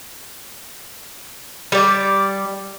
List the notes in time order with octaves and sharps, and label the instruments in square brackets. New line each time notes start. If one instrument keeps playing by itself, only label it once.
[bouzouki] G3 D5